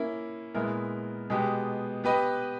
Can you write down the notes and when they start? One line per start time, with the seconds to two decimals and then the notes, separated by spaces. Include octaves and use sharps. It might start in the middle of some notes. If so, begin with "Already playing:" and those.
Already playing: A#3 C#4 E4
0.54 A#2 G#3 B3 E4 A#4
1.30 B2 G#3 B3 G4
2.04 B3 G4 B4 D#5